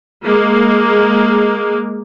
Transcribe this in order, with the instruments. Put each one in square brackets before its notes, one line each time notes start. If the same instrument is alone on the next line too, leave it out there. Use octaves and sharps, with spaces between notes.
[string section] G#3 A#3